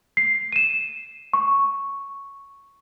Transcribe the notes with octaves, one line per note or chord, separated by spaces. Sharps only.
C7
D#7 E7
C#6